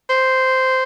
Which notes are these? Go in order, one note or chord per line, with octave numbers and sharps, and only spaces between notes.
C5